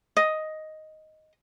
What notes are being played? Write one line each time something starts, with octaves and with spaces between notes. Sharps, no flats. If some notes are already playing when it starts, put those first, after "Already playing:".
D#5